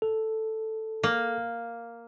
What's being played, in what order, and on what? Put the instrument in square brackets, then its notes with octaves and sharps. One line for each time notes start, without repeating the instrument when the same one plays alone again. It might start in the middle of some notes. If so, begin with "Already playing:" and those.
[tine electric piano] A4
[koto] A#3